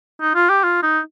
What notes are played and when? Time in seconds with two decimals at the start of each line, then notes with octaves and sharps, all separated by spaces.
0.21 D#4
0.35 F4
0.49 G4
0.63 F4
0.83 D#4